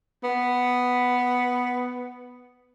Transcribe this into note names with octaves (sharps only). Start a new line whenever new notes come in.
B3